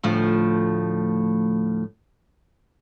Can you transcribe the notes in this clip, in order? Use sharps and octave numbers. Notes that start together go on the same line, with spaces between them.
D2 A2 F3